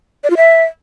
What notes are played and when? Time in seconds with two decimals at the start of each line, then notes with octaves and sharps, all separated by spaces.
0.24 D5
0.30 F4
0.37 E5